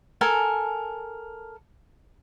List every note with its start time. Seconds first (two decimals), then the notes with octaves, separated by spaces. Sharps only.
0.21 A4 A#4 G#5